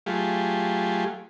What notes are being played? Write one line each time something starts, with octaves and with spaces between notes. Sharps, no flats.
F#3 A3 F4 G4 G#4